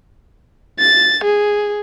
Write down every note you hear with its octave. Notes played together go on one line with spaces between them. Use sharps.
A6
G#4